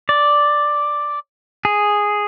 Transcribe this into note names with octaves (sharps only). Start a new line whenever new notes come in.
D5
G#4